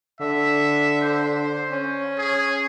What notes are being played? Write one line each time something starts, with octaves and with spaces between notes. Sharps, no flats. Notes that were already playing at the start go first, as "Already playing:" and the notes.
D3 E5
C5
C#4
G#4